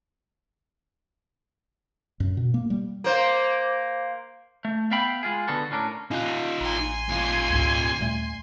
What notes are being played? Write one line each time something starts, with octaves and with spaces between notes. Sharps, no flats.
F#2
B2
A#3
G3
A#3 C5
A3
B3 E5 F5 G5 B5
G#3 F4 G#4
D3 B3 F#4 A4
A2 C#4 D4 A#4
D#4 F4 G#5 F#6
A1 G#5 A#5 C6
D#2 F4
C#2 G#2
D#2 A#2 G3 A3